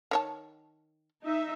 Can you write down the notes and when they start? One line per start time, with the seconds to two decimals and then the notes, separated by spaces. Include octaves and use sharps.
0.11 D#3 C#5 A5
1.24 D#4 E5